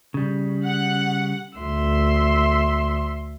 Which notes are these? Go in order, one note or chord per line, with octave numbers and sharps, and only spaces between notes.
C#3 G3
F#5
D2 E5 C6